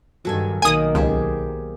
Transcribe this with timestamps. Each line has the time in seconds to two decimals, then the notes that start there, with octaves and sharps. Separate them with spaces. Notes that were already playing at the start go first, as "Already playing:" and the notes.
0.25 G2 D#3 F#3 A4 G#5
0.62 B1 D#3 A#3 G#5 D#6
0.95 C#2 G4 G#4 C5